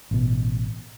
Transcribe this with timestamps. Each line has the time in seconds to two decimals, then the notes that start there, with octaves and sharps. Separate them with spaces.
0.11 A1 B2